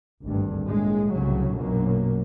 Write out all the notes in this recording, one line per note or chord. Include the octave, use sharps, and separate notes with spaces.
G#1 D2 G2
A#1 A2 G#3
C2 A2 C#3 F#3
A#1 F#2 B2 F#3 A#3